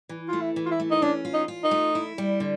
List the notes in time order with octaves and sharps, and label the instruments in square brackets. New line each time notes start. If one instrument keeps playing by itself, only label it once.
[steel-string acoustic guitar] E3
[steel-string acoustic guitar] A3 [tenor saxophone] F4
[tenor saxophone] E4
[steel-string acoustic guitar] E3
[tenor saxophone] F4
E4
[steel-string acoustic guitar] A3
[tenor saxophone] D#4
[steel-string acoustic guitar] C#4 [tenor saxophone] D4
[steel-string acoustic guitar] F4
[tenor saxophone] D#4
[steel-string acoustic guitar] F4
[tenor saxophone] D#4
[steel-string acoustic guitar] A3
E4
G3
D3